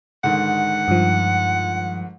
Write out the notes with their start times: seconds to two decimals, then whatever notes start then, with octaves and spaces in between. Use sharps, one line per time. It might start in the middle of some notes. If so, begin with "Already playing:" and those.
0.24 G#2 D3 D#3 F#5
0.88 G2 F3